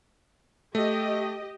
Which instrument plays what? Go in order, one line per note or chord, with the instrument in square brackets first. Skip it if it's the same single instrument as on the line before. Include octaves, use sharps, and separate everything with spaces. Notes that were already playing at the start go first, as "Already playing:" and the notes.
[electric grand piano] A3 [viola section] G4 D#5